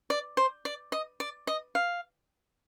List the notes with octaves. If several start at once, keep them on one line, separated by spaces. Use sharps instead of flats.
D5
C5
D5
D#5
D5
D#5
F5